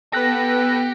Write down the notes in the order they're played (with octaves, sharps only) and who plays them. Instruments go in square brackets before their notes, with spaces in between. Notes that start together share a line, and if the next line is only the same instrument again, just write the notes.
[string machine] B3 F#5 G5 [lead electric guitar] G4 [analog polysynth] A4 B4 [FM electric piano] F#6 A#6